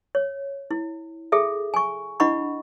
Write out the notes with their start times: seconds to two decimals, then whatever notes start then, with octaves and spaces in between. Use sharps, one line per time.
0.15 C#5
0.71 E4
1.32 G#4 A4 E5
1.74 G#5 C#6
2.20 D4 E4 D#5 F#5 B5 C#6